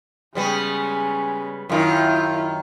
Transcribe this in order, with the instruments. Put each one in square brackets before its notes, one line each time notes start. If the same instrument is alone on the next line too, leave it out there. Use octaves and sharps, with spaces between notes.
[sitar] C#3 G3 B3 [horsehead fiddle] G#3 C#4
[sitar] F#2 D#3 [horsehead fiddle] E4 F4